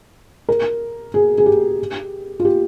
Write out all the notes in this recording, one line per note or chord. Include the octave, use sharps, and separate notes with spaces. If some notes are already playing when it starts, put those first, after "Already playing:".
A#4
G#4
G#4
G4
F4
G4